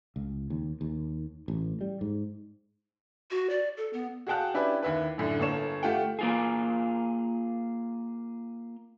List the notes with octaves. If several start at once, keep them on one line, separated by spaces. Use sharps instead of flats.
C#2
D#2
D#2
A1
G3
G#2
F#4
D5
A4
B3
F#4 G#4 F5 G5 A5 F#6
C#4 D4 E4 G4 B4 G5
D#2 E4 B4
F#2 A2 D3
G1 A#3 A4 C#5 E7
A3 F4 G4 F#5 G5
A#3 F4 G#4